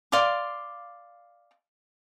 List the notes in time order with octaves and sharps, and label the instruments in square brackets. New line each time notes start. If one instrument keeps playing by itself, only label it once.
[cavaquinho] D5 F5 C6 D6